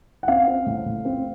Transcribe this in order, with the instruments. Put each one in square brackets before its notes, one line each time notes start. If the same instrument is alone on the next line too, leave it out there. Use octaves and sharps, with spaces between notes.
[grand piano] F#5
C4 F5
C4
A2
A2
C4